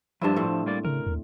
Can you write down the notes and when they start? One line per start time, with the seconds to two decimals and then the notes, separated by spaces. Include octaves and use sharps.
0.21 G2 F3 D4 E4 C5 A5
0.36 A2 C4
0.66 G3 A#3 D5
0.85 C#3 A#4
1.07 D#2